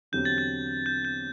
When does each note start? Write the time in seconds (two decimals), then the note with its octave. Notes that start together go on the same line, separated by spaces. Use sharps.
0.12 E2 D3 F#3 C4 G4 G6
0.25 A6
0.38 G6
0.86 G6
1.05 G6